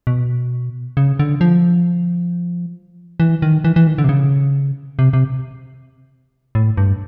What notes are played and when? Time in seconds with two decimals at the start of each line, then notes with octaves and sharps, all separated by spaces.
0.07 B2
0.97 C#3
1.19 D3
1.41 F3
3.20 E3
3.42 D#3
3.64 E3
3.76 E3
3.87 D#3
3.98 D3
4.04 C3
4.09 C#3
4.99 C3
5.13 C3
6.55 A2
6.77 G2